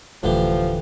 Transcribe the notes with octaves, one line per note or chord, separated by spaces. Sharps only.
D1 A2 D3 E3 F3 G4